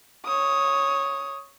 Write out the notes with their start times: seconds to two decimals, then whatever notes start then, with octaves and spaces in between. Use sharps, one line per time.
0.25 C#5 D#6